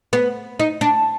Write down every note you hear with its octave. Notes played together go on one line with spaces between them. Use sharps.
B3
D#4
D4